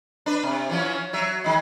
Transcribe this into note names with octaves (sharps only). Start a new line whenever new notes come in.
D4 B4
C3
E3 F3 C#4
F#3 E5
D#3 G#3